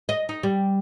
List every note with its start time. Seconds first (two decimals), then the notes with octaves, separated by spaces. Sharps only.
0.09 D#5
0.29 D#4
0.43 G3